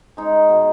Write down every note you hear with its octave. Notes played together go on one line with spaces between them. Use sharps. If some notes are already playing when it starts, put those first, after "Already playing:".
G#3 D#4
B2